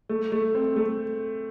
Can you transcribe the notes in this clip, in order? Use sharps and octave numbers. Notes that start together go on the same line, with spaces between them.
A3
A3
C4
A3